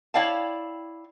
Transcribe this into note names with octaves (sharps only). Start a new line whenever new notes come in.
E4 C#5 D5 F5 G5 A5